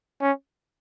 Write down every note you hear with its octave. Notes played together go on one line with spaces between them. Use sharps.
C#4